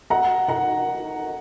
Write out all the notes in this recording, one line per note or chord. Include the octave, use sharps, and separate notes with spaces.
F#5 A#5
F#5 A#5